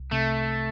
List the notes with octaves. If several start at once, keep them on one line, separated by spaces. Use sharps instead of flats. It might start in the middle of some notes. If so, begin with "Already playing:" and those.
Already playing: C2
C3 A3